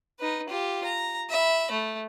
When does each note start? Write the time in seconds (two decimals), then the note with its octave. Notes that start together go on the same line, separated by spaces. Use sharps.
0.19 D#4 B4
0.49 F4 G4
0.85 A#5
1.29 E5 B5
1.71 A3